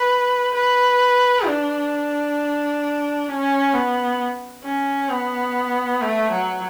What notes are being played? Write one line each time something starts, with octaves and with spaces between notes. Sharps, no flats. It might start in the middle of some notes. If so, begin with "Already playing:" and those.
Already playing: B4
B4
D4
C#4
B3
C#4
B3
A3
F#3